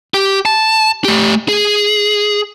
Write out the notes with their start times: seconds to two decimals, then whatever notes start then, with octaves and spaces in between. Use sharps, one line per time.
0.14 G4
0.45 A5
1.05 A3 G4
1.49 G#4